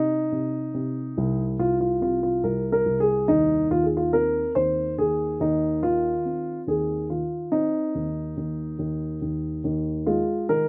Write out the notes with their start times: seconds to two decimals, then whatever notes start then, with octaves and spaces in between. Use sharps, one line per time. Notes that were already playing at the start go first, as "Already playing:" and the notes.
Already playing: C3 D#4
0.32 C3
0.74 C3
1.17 C2
1.59 C2 F4
1.81 F4
2.01 C3 F4
2.23 F4
2.44 C2 A#4
2.72 A#4
2.86 C2
3.00 G#4
3.28 D#2 D#4
3.70 D#2 F4
3.84 G#4
3.97 F4
4.13 C4 A#4
4.55 D#2 C5
4.98 D#2 G#4
5.40 D#2 D#4
5.83 D#3 F4
6.25 C4
6.67 D#2 G#4
7.10 D#3 F4
7.52 C4 D#4
7.95 D#2
8.37 D#2
8.79 D#2
9.21 D#2
9.64 D#2
10.06 G#3 F4
10.49 D#3 A#4